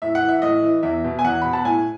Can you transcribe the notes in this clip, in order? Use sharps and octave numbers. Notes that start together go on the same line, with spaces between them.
A2 E5
F#5
E3
E5
A2 D#5
E3
E2 E5
B2
G#5
E2 F#5
B2 B5
A5
A2 G#5